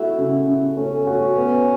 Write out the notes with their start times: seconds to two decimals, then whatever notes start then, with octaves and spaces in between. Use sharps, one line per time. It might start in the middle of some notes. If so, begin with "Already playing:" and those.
Already playing: A3 E4 F#4
0.18 C#3
0.48 C#3
0.77 A3 C#4
1.07 F#4
1.36 B3